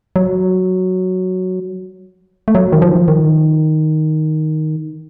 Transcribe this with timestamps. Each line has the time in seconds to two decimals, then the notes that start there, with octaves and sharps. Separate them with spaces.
0.16 F#3
2.48 A3
2.55 F#3
2.73 D#3
2.82 F3
3.08 D#3